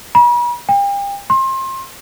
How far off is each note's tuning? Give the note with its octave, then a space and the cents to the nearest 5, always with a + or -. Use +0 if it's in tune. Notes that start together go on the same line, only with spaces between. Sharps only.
B5 -45
G5 +35
C6 +30